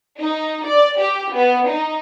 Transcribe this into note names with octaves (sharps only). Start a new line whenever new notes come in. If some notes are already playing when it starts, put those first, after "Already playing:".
D#4
D5
G4
B3
D#4